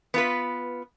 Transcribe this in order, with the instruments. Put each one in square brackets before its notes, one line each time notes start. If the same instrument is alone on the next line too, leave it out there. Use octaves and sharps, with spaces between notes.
[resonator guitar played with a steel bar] B3 F4 B4